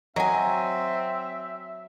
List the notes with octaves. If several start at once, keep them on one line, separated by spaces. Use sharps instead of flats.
F#3 C4 D#5 E5 G#5